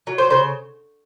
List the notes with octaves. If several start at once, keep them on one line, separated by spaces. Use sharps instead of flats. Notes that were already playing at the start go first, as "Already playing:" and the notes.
F#3
C5
C#3 C5